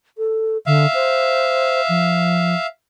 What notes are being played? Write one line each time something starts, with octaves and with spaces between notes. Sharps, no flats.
A4
D3 E5 F5
C5
F3